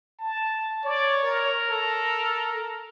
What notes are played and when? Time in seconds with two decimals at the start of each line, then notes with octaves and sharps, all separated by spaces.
0.19 A5
0.85 C#5 D5
1.23 A#4
1.71 A4